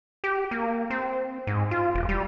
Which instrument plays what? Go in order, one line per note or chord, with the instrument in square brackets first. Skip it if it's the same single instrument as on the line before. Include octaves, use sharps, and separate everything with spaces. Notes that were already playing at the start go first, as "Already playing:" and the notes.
[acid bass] G4
A#3
C4
G#2
F4
E1
G3